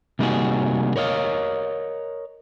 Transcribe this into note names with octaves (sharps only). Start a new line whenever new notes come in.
C3 G3 A#3 D#4 F#4 G#4
A#4 C#5 D#5 F5